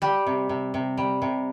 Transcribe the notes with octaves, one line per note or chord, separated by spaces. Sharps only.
G3 G4
C3
C3
C3
G3
C3